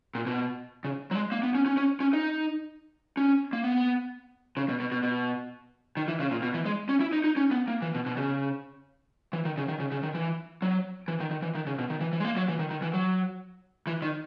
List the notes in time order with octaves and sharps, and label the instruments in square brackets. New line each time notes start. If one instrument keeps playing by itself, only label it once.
[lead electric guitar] A#2
B2
C#3
F#3
G#3
A#3
B3
C#4
C#4
C#4
C#4
D#4
C#4
A#3
B3
C#3
B2
B2
B2
B2
D#3
E3
C#3
A#2
B2
E3
G#3
C#4
E4
D#4
D#4
C#4
B3
A#3
E3
B2
B2
C#3
E3
D#3
C#3
D#3
C#3
C#3
D#3
E3
F#3
E3
D#3
D#3
E3
D#3
C#3
B2
D#3
E3
E3
G#3
A#3
F#3
E3
D#3
D#3
E3
F#3
E3
D#3